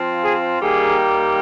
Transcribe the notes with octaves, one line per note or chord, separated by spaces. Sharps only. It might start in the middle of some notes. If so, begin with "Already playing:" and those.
Already playing: F3 C4 F4
G#4
D#3 G3 A#3 G#4